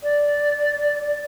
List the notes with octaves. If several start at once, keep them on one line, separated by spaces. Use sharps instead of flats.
D5